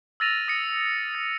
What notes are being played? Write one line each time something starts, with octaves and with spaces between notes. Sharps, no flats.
E6 F6 A6 A#6 D#7 F7
D#6 A#6 C#7
A6